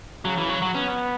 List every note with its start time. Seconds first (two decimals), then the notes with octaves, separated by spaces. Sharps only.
0.25 C#3 F#3
0.38 E3
0.50 F#3
0.62 F#3
0.74 B3 C#4